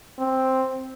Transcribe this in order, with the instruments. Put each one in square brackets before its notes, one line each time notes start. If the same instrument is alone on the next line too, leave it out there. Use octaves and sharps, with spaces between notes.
[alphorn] C4